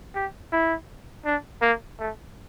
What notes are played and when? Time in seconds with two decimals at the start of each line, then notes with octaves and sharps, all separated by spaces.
0.15 G4
0.52 E4
1.25 D4
1.61 A#3
1.99 A3